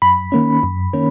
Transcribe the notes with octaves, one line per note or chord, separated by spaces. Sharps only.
F#2 B5
D#3 A#3 C#4
F#2
D#3 A#3 C#4